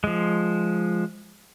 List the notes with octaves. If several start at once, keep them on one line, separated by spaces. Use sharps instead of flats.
F3 G#3